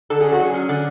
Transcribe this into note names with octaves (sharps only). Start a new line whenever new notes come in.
D3 A4
C#4 G#4
F#4
F#3 G#4
C#4
D3